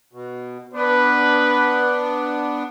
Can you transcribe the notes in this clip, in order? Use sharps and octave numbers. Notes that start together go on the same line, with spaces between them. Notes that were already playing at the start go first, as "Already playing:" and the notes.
B2
B3 D4 B4